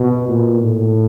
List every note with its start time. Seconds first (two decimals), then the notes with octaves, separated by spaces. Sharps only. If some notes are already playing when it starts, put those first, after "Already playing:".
Already playing: B2
0.28 A#2
0.61 A2